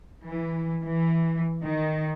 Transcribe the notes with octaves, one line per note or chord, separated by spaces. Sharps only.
E3
E3
D#3